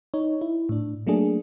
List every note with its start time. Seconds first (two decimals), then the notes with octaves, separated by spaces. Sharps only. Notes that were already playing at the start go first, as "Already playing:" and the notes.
0.14 D#4 C#5
0.41 E4
0.69 A2 D4
1.07 F#3 A3 A#3 D4 G#4